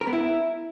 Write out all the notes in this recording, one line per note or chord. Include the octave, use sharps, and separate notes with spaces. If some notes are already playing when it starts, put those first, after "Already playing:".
A#4
B3
E4